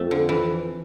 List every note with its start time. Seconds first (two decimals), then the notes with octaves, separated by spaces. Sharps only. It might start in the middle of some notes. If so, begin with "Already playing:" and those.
Already playing: F2 A3
0.11 D3
0.29 E3